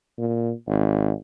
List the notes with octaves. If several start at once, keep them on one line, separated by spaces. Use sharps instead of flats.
A#2
G#1